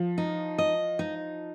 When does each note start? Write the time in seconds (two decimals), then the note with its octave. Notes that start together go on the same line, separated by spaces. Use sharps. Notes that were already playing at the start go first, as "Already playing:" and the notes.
Already playing: F3
0.18 D#4
0.58 D#5
0.99 D#4